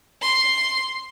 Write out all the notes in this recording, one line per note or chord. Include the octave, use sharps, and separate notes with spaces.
C6